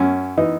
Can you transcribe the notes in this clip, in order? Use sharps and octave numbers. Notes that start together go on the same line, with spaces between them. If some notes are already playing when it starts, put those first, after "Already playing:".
Already playing: F#2 C#4
E3 D#4